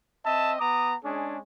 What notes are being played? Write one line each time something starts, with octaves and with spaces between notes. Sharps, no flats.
C4 D#5 E5 A5
B3 A#5 D6 D#6
G#3 C#4 D4 G#4